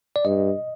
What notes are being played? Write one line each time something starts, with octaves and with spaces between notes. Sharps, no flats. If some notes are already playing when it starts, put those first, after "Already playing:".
D5
G2 D#5